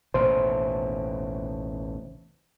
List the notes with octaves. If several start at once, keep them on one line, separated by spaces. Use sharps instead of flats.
A1 D#2 B2 C5